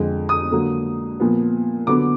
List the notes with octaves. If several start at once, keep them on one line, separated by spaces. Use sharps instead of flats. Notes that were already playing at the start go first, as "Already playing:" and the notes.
Already playing: F2 D3 G#3
D#6
D3 F#3 A#3
A#2 F3 B3
D3 F#3 B3 D6